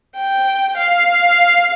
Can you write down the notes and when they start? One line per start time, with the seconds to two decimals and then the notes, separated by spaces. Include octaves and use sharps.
0.17 G5
0.77 F5